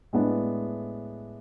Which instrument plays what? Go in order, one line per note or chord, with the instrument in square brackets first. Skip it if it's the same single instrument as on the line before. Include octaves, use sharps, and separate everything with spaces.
[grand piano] A2 G#3 B3 D4